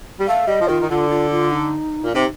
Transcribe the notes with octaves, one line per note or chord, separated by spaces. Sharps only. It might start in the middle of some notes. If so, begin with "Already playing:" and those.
G3
A3 F5
G3 D#5
F3
D#3 F4
D#3
D3 F4
F4
F4
D#4
A#2
C3 D#4